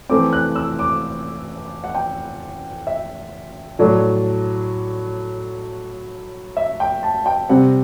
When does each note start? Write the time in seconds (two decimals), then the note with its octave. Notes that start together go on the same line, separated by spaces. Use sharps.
0.09 E3 A3 C4 D6
0.33 F#6
0.56 E6
0.79 D6
1.84 F#5
1.95 G5
2.87 E5
3.79 A2 F#3 A3 D4 D5
6.57 E5
6.80 G5
7.03 A5
7.26 G5
7.49 C3 G3 C4 F#5